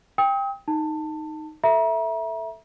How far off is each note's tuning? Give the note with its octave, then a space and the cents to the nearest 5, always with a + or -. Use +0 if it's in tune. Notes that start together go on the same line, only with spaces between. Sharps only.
G5 +20 D#6 +40
D#4 +0 A5 +20
A4 +0 E5 +0 A#5 +35